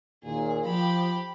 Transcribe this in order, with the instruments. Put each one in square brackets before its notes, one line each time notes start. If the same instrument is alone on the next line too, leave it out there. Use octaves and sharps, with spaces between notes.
[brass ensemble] D#2 A#2 [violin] G#4
[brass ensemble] F3 [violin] G4 B5